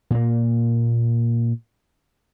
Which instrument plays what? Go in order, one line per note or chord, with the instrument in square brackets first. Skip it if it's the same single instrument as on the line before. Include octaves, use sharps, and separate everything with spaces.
[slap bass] A#2 A#3